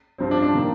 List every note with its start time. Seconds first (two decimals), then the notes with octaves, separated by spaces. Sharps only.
0.18 G2 F3 C4
0.31 D4
0.42 D4
0.55 D#3 A#3